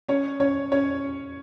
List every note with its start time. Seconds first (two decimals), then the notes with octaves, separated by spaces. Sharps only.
0.09 C#4 C#5
0.40 C#4 C#5
0.72 C#4 C#5